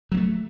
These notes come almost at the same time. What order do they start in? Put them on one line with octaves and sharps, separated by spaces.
F#3 A#3 A3